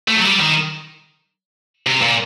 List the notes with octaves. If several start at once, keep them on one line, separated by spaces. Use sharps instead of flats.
A3
F#3
G3
D#3
C3
A#2